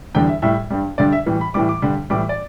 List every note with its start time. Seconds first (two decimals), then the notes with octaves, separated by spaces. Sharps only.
0.15 E2 D3 G3 G5
0.29 E5
0.42 A2 G3 E5
0.71 G2 G3
0.98 G2 D3 G3 D5
1.12 E5
1.26 A2 E3 G3
1.41 B5
1.54 A2 E3 G3 D6
1.69 D6
1.82 G2 D3 G3
2.10 A2 E3 G3 D6
2.29 D5